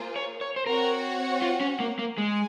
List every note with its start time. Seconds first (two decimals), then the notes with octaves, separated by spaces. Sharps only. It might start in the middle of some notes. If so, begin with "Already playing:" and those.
Already playing: A#3 F4 G#4 C5
0.16 C#5
0.41 C#5
0.56 C5
0.66 C4 F#4 A#4 C#5 F#5
1.42 F4
1.61 C#4
1.80 A#3
1.99 A#3
2.17 G#3 G#5